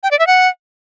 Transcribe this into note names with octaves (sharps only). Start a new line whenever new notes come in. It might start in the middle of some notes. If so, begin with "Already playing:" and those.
G5
D5
E5
F#5